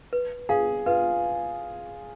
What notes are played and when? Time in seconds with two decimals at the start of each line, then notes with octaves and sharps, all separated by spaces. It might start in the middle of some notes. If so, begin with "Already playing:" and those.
0.13 B4
0.49 G#4 F5
0.86 F4 B4